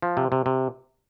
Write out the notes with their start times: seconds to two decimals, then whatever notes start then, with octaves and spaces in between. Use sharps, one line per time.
0.02 F3
0.17 C3
0.32 C3
0.46 C3